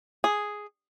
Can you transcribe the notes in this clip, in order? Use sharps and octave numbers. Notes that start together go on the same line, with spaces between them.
G#4